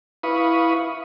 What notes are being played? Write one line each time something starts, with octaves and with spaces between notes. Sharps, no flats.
E4 B4 F5 B5 C#6 D#6